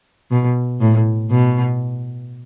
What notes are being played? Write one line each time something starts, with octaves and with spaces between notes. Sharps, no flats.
B2
A2
B2